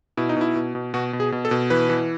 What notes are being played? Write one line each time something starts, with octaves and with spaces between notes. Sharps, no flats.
B2 E4
D#4
B2 E4
B2
B2
B2 F#4
B2
G#4
B2
A4
B2
E3 B4
E3